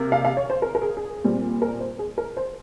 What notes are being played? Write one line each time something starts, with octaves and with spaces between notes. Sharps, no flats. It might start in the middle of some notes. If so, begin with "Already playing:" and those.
Already playing: C3 A#3
F5
F5
C#5
C5
A#4
A#4
G#4
G#4
A#2 G3 C4
A#4
C5
G#4
A#4
C5